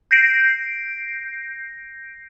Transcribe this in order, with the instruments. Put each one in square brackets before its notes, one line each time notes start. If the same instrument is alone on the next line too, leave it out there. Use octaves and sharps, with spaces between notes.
[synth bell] G6 A#6 C7 D7